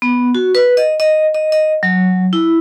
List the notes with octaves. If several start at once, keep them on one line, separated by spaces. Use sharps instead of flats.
B3
F#4
B4
D#5
D#5
D#5
D#5
F#3
E4